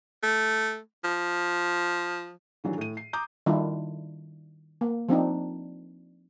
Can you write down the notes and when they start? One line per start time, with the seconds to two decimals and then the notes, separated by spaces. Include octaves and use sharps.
0.23 A3
1.04 F3
2.64 D#3 E3 F#3 D4 G4
2.78 A2 D#7
2.97 C7
3.13 A#5 D6 D#6 G6
3.46 D#3 G3 D4 E4 F4
4.81 A#3
5.09 F3 C4 D4 D#4